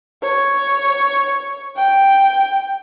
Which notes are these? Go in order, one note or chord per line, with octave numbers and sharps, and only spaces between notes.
C#5
G5